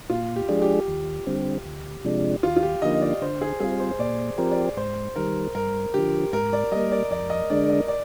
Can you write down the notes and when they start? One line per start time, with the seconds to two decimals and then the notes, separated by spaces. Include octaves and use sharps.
0.10 A#2 F4
0.36 G4
0.49 F3 G#3 D4 G#4
0.62 G4
0.88 D#2
1.27 D3 G3 C4
1.65 D2
2.04 C3 F3 G#3 D4
2.43 D#2 F4
2.57 F4
2.63 G4
2.82 D3 F3 A#3 D#4 D#5
3.02 D5
3.21 D3 C5
3.41 G#4
3.60 G3 C4 F4 G#4
3.80 C5
3.99 A#2 D5
4.38 F3 C4 G4 A#4
4.51 D5
4.77 G#2 C5
5.16 D#3 G3 A#4
5.55 G2 A#4
5.94 D3 F3 G4
6.33 G#2 A#4
6.53 D5
6.72 G3 A#3 D#5
6.92 D5
7.11 F2 D5
7.30 D#5
7.50 D3 G#3 D4 D5
7.70 D#5
7.88 D5